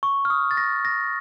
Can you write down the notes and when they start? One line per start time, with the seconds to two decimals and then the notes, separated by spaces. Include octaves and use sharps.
0.03 C#6
0.25 F6
0.30 D#6
0.51 A6
0.57 A#6
0.85 A#6